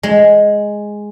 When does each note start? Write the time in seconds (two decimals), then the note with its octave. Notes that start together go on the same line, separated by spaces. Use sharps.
0.03 G#3